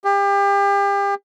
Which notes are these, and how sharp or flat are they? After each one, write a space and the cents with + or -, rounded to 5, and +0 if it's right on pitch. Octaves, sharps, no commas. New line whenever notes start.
G4 +35